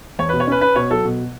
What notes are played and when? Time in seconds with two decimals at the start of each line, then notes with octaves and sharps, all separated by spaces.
0.19 E2 C#5
0.29 B2 B4
0.40 C#5
0.47 C#4 B4
0.61 C#4 B4
0.76 B2 C#5
0.91 F#3 A4
1.05 B2